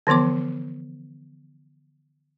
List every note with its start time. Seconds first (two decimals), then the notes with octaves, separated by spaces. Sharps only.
0.07 D3 E3 F3 B3 D6